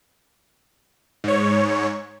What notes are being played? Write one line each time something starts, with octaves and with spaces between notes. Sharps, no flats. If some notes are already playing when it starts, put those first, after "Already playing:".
G#2 C#5